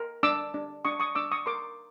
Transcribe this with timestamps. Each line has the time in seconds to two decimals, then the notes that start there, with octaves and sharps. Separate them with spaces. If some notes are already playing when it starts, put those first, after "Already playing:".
Already playing: A#4
0.23 D4 D6 E6
0.54 D4
0.85 D4 C#6 D#6
1.00 C#6 D#6
1.15 D4 D6 E6
1.32 C#6 D#6
1.46 A#4 C6 D6